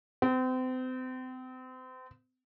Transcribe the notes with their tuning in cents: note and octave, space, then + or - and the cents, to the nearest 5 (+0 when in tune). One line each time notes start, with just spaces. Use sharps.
C4 -35